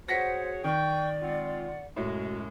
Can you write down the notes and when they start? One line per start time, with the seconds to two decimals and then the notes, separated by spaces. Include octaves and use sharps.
0.08 F#4 G#4 C5 C#5 F#5 A#6 B6 C#7
0.64 D#3 D5 G5 C#6
1.22 G#3 C4 F4 F#5
1.96 F#2 A2 C3 G#3 F#4